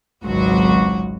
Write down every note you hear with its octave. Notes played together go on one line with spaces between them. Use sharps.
G#1 C#2 F#3 F#4